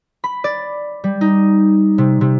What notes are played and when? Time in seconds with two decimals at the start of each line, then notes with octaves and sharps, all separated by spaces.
0.24 B5
0.44 D5
1.04 G3
1.21 D#4
1.98 C3
2.21 C3